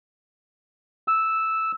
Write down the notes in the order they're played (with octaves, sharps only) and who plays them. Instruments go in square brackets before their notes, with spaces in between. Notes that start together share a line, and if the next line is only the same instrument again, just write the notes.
[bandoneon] E6